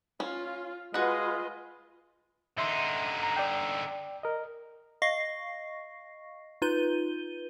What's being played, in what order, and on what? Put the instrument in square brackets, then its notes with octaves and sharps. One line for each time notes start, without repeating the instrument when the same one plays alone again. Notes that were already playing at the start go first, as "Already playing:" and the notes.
[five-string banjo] C#4 [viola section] F4
[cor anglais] G#3 [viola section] F4 B4 D#5 [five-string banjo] F#4 F#5
[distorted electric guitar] D3 D#4 [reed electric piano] E5 C6
[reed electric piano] A#5
D5 G5
A#4 D#5
[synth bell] D#5 F5 C#6 A#6 C7
D#4 F4 B4 G6 D#7 G7